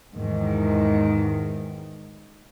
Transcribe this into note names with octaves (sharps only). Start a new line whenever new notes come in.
E2 G#2 D#3